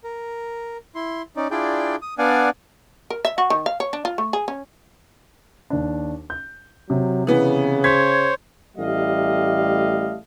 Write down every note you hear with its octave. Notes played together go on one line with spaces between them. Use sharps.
A#4
E4 C6
C#4 D#4 D5
D4 E4 F4 G#4 D5 G5
D#6
B3 D4 D5 F5 F#5 G#5
A#4
E5
F#4
D#3
F5
C#5
D4
F4
A3
G#4
C#4
D#2 D4
G6
C3 F#3
C#3 E3 B3
C5 C#5 G#6 B6
A1 G3 A3 D#5 F5